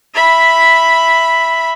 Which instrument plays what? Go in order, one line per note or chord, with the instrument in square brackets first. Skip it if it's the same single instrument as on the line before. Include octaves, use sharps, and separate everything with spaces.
[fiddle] E5 B5